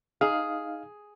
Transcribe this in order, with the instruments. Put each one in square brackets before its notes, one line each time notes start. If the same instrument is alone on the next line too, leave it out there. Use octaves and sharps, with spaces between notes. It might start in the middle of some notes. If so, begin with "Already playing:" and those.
[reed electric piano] D#4 F5 [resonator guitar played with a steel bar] G#4